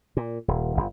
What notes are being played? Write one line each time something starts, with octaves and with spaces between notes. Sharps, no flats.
A#2
D#1
G1